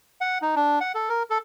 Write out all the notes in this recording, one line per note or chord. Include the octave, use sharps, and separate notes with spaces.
F#5
D#4
D4
F#5
A4
A#4
A4